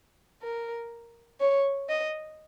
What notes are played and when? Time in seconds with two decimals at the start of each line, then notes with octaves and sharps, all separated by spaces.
0.42 A#4
1.41 C#5
1.89 D#5